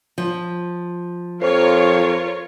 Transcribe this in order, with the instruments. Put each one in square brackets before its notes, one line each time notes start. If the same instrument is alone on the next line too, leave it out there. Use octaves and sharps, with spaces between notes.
[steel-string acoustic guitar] F3
[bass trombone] F2 [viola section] F4 A#4 C#5 [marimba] C5